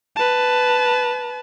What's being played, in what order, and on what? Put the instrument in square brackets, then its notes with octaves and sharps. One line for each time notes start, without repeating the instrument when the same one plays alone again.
[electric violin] B4 A5